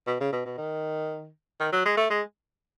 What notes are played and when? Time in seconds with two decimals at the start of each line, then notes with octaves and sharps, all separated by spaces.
0.07 B2
0.20 C#3
0.32 B2
0.46 B2
0.58 D#3
1.60 D#3
1.72 F#3
1.85 G#3
1.97 A3
2.10 G#3